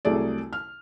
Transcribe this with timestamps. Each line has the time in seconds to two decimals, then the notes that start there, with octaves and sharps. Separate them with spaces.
0.05 C2 F#3 A3 G#4 D5
0.53 F6